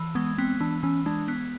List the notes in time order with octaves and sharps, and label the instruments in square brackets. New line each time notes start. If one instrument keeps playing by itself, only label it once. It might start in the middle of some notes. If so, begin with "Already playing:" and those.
Already playing: [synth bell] E3
[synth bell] G#3 [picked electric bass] B3
[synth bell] B3 [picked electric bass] C4
[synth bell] E3 [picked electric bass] D4
[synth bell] E3 [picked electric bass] C#4
[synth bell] G#3 [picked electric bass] D4
[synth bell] B3